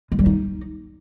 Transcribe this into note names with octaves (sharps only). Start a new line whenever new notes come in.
G#3
G3
D#4